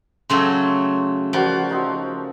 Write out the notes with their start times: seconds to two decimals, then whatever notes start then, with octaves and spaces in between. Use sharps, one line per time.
0.30 C#3 F#3 A3 C#5 G5 C6
1.33 F3 G3 F#4 A#4
1.69 C4 D#4 F#4